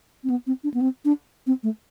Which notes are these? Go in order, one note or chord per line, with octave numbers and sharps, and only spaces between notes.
C4
B3
C4
D4
B3
C4
D4
C4
A3